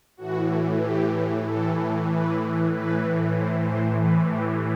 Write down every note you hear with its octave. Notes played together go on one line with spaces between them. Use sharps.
A2 E3 F#4
G4
A2 E3 A4
B4
A2 E3 B4
C5
C5
A2 E3 B4
G4